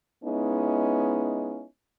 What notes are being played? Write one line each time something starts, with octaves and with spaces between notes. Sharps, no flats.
G#3 B3 C#4 D#4 E4